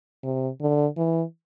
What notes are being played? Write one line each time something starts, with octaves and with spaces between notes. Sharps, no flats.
C3
D3
E3